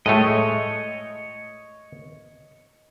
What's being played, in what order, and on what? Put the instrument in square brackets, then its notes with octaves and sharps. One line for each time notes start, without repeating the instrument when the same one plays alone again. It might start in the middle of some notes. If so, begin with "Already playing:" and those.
[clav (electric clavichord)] A2 G#3 A3 [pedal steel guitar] C#5 D#5